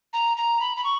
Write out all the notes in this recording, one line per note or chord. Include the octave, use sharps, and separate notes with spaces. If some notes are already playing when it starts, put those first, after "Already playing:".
A#5
A#5
B5
B5
C#6